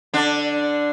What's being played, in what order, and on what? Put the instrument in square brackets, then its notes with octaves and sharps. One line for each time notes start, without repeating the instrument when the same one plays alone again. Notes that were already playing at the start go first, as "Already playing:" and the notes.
[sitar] D3 D4